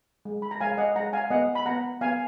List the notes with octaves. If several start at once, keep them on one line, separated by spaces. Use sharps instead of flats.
G#3
B5
A#5
G#3 F5 G#5
D#5 F#5
G#3 F#5 A#5
F5 G#5
B3 D#5 F#5
B5
B3 F#5 A#5
B3 F5 G#5